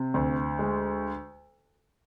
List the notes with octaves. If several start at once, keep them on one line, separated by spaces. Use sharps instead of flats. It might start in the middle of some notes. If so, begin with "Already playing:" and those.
Already playing: C3
D2
G#3